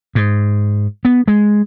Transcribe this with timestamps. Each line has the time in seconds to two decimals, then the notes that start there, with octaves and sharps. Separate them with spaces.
0.15 G#2
1.05 B3
1.28 G#3